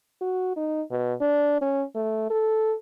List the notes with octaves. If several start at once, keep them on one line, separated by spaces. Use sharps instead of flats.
F#4
D#4
B2
D4
C#4
A3
A4